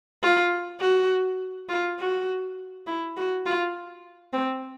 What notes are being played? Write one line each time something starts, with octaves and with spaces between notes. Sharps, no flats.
F4
F#4
F4
F#4
E4
F#4
F4
C4